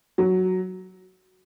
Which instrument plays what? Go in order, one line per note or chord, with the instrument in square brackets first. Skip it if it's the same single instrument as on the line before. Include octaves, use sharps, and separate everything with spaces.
[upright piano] F#3